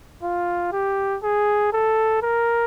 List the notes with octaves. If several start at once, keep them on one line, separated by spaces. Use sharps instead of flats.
F4
G4
G#4
A4
A#4